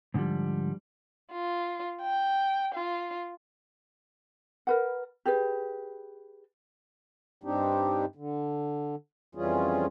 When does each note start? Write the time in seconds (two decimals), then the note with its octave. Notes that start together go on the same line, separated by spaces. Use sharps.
0.14 G#2 D3 E3 F3 G3
1.32 F4
2.01 G5
2.74 F4
4.67 A#4 B4 F#5
5.25 G4 G#4 B4
7.43 G2 G3 C4 D4 D#4 G4
8.15 D3
9.35 F2 E3 G3 C#4 F4 G#4